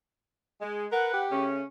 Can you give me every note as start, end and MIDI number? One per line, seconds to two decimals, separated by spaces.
0.61 0.85 56
0.92 1.10 70
0.92 1.24 71
0.92 1.24 78
1.14 1.47 67
1.31 1.62 49
1.31 1.62 57
1.31 1.62 61